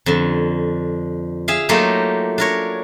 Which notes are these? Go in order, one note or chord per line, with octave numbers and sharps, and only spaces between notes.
F2 D3
G#4 E5 F5
F#3 A3 A#3 D#4 F4 G4
D4 A#4 C#5